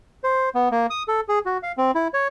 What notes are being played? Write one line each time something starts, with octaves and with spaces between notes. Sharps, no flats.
C5
B3
A#3
D#6
A4
G#4
F#4
F5
C4
E4
C#5